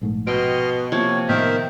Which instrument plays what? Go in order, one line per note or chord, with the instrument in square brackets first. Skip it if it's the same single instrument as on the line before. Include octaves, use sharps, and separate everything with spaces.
[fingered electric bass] A#1 G#2 A3
[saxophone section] B2 [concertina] D#5 C6 F6 [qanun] G5
[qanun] C3 F3 A#3 [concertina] C#5
[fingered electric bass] A2 B3 [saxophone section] D#3 [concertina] A#4 C5 E5